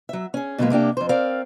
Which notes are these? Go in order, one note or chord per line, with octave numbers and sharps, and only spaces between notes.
F#3 E5
C#4 G#4
B2 D3 D#3 F#3 G#3 A#3
C3 A#3 D4 G4
F2 C5
C4 A#4 D5 F5